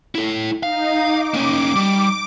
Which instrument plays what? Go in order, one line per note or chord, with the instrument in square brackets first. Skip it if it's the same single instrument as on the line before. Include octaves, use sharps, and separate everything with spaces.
[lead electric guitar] E4 A4
[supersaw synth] D#4 [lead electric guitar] F5
[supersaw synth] D6
[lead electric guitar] A#3 C#4
G3